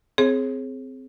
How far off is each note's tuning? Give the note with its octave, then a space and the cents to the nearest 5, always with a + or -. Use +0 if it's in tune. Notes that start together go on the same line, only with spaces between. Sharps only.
C4 -10 G#4 +15 C#5 -35